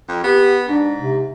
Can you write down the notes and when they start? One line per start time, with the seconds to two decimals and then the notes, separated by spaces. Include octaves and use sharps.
0.09 F2
0.24 B3 G4
0.68 G#2 D4
0.97 C3